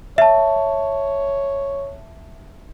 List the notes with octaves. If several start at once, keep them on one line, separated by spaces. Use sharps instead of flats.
C#5 E5 A5